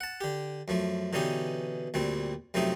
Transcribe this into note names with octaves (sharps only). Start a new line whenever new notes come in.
F#5 A5
D3 G4
F#2 F3 A3
B2 D3 E3 C#4 D#4 G4
D2 A#2 G3 C4
F#2 C3 F3 A3 C4 D#4